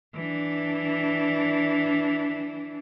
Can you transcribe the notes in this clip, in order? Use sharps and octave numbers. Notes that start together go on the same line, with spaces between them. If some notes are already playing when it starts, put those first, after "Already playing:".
E3 D4